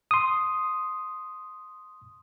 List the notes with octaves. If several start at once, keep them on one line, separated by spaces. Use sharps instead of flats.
C6 D#6